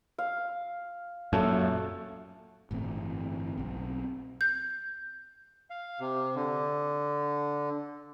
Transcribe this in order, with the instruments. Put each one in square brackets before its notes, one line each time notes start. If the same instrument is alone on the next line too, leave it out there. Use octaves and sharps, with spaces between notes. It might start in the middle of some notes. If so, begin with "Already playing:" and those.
[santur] F5
[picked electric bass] F#2 A#2 [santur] A3 A5
[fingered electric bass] G1 A2 E3 C4
B1 C4
[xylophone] G6
[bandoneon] F5
C3
D3